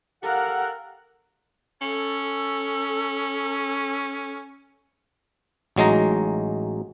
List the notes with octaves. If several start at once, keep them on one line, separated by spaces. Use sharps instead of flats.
G4 A4 A#4 F5 F#5
C#4 A4
A1 F#3 G#3 D#4 A#5